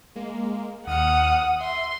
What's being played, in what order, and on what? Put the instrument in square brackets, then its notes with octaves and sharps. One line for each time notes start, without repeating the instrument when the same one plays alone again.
[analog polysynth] G#3 A#3
[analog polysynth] D#2 F6 C#7 [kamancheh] F#5 D#6
[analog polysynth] E5 [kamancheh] C6